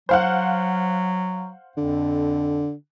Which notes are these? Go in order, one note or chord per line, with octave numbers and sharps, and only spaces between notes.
F#3 C5 F5 F#5
F2 D3